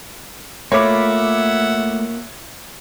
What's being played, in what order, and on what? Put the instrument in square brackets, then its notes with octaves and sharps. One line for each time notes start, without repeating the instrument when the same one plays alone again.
[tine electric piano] A3 [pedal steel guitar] A#3 F4 B5 [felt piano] C#5 D6 [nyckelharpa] E5 F#5